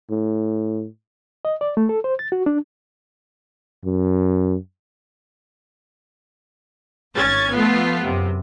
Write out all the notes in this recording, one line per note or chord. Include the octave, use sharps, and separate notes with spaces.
A2
D#5
D5
A3
A4
C5
A6
F#4
D4
F#2
G#1 C#4 G#6 A6
F3 A3 B3 F4
F#2 C3